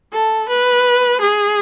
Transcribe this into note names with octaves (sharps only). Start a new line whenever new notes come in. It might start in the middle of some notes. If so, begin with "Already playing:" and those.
A4
B4
G#4